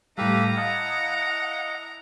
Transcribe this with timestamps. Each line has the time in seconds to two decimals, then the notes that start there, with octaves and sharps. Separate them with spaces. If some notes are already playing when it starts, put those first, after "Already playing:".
0.18 A2 G3 E4 G4 A4 B4 F5 A#5
0.57 D#5 F5 F#5 A5 D#6